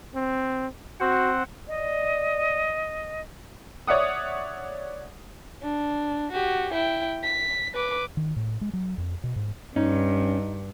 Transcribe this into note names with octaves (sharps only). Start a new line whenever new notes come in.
C4
C4 F#4 C5 F#5
D5 D#5
C#5 D5 E5 F#5 D#6
D4
F#4 G4
E4 G5
B6
B4 D6
D#3
A2
G#3
F#3
F2
B2
G#2
G2 C#4 D#4